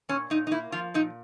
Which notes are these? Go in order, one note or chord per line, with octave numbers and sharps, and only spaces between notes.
A#2 C#4
A#2 D#4
D#4
A#3 E4
F3 F4
A#2 D#4